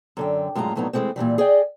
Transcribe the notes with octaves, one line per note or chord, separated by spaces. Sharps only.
F#2 D3 G5
F#2 A2 G#3 F4 A#5
F2 A2 F#3 B3 D#4 A#5
E3 F#3 G#3 A3 C4
A#2 C#3 E3 G3
G#4 D5 D#5 G5